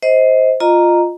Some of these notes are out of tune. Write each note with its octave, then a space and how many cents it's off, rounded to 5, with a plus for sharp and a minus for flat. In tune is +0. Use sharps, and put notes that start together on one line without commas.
C5 +0 D#5 +30
F4 +0 D#5 -15 A#5 +0